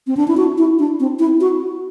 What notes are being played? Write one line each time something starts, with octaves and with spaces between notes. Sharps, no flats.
C4
D4
E4
F#4
E4
D4
C4
E4
F#4